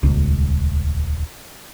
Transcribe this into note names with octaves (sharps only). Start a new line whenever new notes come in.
D#1 C#2